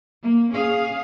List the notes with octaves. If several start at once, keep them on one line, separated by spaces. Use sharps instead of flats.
A#3
C#4 G#4 F5